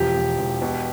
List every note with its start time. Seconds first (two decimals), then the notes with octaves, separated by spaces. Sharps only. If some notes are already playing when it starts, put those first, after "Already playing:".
Already playing: E1 F3 G4
0.16 E1
0.39 E1
0.62 B2